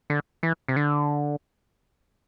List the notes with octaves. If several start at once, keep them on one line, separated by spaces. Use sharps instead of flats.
D3
E3
C3
D3